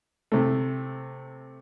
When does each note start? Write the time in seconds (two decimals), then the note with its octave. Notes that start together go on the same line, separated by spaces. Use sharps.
0.32 C3 A3